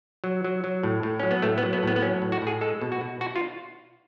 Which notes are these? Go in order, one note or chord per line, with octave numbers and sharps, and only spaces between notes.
F#3
F#3
F#3
A2
A2
F#3 C#4
B3
A2 A3
B3
F#3
B3
A2 B3
B3
F#3 C#4
A2
F#4
A2 G#4
G#3 A4
B2
F#4
B2
B2 F#4
F4